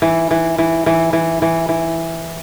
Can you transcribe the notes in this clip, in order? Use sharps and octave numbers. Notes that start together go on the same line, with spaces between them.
E3
E3
E3
E3
E3
E3
E3